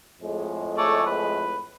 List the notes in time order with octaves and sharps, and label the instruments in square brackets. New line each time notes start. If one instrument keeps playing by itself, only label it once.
[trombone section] F2 A2 G#3
[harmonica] A3 C#5 D5
B4